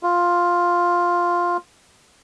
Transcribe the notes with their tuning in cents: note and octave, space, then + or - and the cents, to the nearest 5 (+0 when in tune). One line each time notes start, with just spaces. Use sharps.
F4 +5